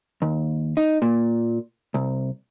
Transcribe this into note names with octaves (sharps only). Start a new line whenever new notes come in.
D#2
D#4
A#2
C2